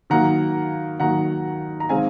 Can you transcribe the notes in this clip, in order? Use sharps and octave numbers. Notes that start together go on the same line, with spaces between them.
D#3 F#3 A#3 F#5 A#5
D#3 F#3 A#3 F#5 A#5
A#5
D#3 G#3 C4 F5 G#5